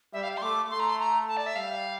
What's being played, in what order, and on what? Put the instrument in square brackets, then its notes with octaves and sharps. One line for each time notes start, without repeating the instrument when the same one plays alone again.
[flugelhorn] G3 [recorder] E5
[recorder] F5
F5
C6
[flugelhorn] A3 [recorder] D6
[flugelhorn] A3 [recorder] C6
[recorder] A#5
C6
A#5
A5
D5
E5
[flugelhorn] G3 [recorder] F5